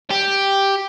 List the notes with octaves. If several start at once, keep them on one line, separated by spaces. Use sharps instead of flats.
G4